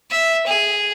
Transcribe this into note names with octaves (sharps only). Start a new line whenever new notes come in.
E5
G#4